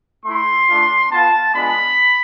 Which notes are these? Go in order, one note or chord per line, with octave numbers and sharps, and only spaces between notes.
A3 E4 C6
A3 D4 F4
B3 F4 A5
G#3 B3 D4 F4 B5